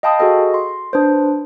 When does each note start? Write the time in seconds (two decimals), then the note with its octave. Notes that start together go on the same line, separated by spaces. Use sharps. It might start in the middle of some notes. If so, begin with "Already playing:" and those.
0.03 D#5 F5 G5 A5 B5 D#6
0.20 F#4 G#4 A4 D#5
0.54 C6
0.93 D4 B4 C5